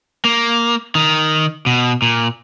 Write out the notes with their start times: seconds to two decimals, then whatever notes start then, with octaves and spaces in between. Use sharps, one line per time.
0.25 A#3
0.95 D#3
1.66 B2
2.02 A#2